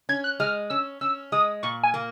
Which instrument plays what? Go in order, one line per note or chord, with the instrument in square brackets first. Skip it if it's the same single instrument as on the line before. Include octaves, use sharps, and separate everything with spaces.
[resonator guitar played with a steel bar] C#4 [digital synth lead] G#6
[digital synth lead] F#6
[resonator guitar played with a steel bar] G#3 [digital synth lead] F6
[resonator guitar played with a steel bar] C#4 [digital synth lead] E6
[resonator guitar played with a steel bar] C#4 [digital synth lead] E6
[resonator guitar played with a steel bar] G#3 [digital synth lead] D#6
[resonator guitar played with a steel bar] A#2 [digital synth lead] C#6
[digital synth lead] G#5
[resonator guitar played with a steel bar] A#3